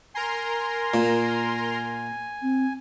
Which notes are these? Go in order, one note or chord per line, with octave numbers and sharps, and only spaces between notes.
A#4 G#5 A#5 C6
A#2
C4